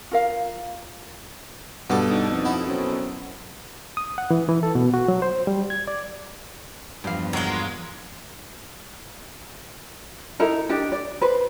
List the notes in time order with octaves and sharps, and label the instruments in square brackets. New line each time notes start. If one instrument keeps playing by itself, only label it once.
[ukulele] F4 A#4 F5
[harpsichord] G2 B3 D6 [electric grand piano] B2 A4
[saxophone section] D4 D#4
[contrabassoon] F2
[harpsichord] B3 E4
[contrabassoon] F#2 [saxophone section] F#3 C4 C#4
[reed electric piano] D#6
F#5
E3
E3
A4
B2
F#4
F#3
C5
G3
G#6
D5
[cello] E2 F3 [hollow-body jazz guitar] G2 F5
[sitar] F#3 G#3 [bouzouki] A#3 F4
[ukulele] D#4 E4 A4 A#4
D4 D#4 G4
D5
B4 C5